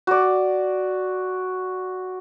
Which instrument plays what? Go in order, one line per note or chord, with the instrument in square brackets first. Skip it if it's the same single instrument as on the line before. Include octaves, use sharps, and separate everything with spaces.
[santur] F#4 D5